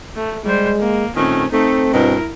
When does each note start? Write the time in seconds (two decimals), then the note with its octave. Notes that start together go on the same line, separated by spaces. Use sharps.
0.16 A3
0.45 G3 G#3 C5
0.81 A#3
1.16 A#2 D#3 A3 C4 C#4
1.52 A3 C4 D#4
1.92 G2 B2 E4 A#4